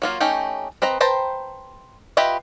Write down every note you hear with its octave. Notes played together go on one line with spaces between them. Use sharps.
F#3 A#3 F4
A3 C#4 D#4 G4
C4 B4 D#5 A#5
B4 C5 G5 A5 A#5
F4 G4 B4 D#5 E5